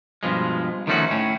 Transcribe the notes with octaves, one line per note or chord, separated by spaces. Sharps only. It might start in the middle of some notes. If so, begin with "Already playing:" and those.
G2 B2 F3 G#3
D#3 F3 A3 C#4 D#4 F#4
A2 C#4